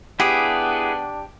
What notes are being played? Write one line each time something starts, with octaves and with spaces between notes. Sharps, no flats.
B3 D4 E4 G4 G#4